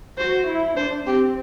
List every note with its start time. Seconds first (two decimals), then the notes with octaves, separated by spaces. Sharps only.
0.18 F#4 C5
0.48 E4
0.76 D4 C5
1.06 C4 G4